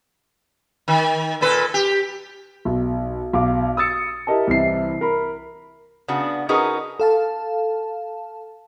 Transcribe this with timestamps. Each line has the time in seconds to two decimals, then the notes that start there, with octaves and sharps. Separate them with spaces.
0.88 D#3
1.41 A#2 A4 B4
1.74 G4
2.65 B1
3.33 B1 F5 D6
3.77 D#6 E6 A6 C#7
4.27 E4 G4 A#4 D#5 A5
4.47 C2 C3 E3 G3 C7
5.01 A#4 B5
6.08 C#3 B3 D4 F#4
6.49 C#4 D#4 F#4 G#4 A#4 B4
7.00 A4 F5 A5